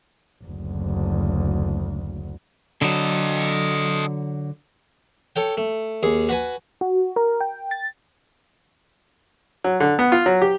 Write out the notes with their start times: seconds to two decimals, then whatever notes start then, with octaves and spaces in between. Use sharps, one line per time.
0.44 F#1 D2
2.82 D3 F#3 A4 D#5
5.36 A4 C#5 G5
5.57 A3
6.03 D#2 G#4
6.29 F#4 B4 G#5
6.81 F#4
7.16 A#4
7.40 G5
7.71 A6
9.64 F#3
9.80 D3
9.99 B3
10.12 F4
10.26 F#3
10.42 G4